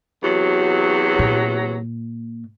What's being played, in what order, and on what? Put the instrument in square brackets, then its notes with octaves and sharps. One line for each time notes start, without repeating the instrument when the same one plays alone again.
[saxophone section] E2 C3 F#3
[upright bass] A#2